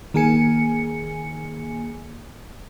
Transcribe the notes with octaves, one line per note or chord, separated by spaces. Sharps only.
D#3 A#3 G#4 G#5 C#7